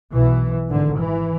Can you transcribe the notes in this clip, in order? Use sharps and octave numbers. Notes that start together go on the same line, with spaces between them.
B1 B2 E3
G#1 G#2 D3
E3